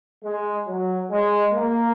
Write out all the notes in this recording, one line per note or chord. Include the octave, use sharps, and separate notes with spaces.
G#3
F#3
G#3
A#3